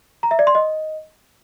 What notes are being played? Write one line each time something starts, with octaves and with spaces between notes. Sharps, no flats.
A#5
E5
D5
C6
D#5